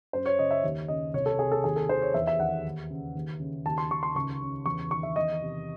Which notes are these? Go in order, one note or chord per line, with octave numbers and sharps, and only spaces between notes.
F#2 C5
C#5
C#3 D#5
E5
D#2
C#3 D#5
C2 C#5
A4
C3 G#4
A4
D#2 G#4
A4
D#3 C5
C#5
E2 E5
E5
D#3 F#5
D#2
C#3
D#2
C#3
D#2 A5
C6
D#3 C#6
C6
C#2 C#6
C#3
E2 C#6
D#3 C#6
E5
E2 D#5
C3